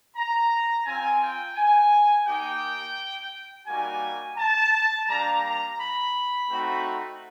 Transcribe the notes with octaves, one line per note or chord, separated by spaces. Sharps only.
A#5
C4 F4 G#5
G5
G#5
A#3 D#4 G4 G5
G3 A#3 D#4 F#4 G#5
A5
G3 A#3 D4 A#5
A#5
B5
A3 C4 D#4 F#4